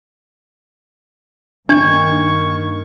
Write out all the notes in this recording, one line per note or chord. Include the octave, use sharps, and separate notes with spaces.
G2 D#3 A#3 D4 C#6 G#6